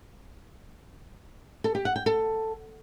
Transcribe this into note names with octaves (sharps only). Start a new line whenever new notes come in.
A4
G4
F#5
G5
A4